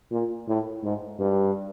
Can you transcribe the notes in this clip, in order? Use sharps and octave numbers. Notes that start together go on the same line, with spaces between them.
A#2
A2
G#2
G2